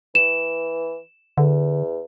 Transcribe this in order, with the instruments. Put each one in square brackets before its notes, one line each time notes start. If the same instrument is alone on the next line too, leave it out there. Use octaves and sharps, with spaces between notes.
[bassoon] E3 [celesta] E7
[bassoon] E2 [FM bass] D3